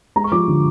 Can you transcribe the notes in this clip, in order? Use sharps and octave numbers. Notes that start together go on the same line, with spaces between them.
G#3 A#5
C#6
F3 D6
D3